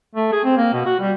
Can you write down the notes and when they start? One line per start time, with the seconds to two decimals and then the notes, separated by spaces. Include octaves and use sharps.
0.15 A3
0.32 G#4
0.44 C4
0.57 A#3
0.73 B2
0.86 F#4
1.00 G3